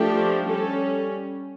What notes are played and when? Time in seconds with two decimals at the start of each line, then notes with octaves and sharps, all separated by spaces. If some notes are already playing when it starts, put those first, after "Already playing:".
Already playing: F3 A3 D4 G4
0.47 G3 C#4 A4